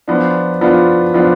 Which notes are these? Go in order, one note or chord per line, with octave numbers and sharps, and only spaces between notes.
F3 B3 D4 F4
F3 B3 D4 F4
F3 B3 D4 F4